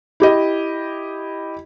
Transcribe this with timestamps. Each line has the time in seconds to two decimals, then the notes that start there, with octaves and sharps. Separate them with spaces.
0.20 E4 G4 D#5